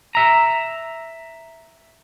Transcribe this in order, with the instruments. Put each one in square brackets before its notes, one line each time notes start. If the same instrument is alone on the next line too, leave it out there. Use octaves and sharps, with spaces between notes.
[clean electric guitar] E5 A#5